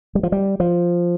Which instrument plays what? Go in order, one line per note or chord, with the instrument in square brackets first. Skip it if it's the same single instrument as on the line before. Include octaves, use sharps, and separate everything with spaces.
[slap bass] G3
F3
G3
F3